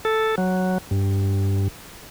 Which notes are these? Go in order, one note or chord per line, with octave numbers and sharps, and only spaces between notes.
A4
F#3
G2